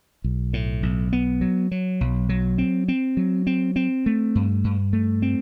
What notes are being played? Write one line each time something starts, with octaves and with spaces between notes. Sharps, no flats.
B1
A2
B1
B3
F#3
F#3
B1
F#3
C4
C4
F#3
C4
C4
A3
G2
G2
A3
C4